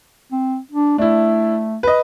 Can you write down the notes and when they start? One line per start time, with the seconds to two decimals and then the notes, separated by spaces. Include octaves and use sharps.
0.32 C4
0.71 D4
0.98 A3 D4 E4
1.83 B4 D#5